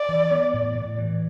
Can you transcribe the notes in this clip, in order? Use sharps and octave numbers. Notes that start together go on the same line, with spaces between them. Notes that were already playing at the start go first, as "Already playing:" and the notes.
Already playing: D5
E3
B3
A2
A2
E3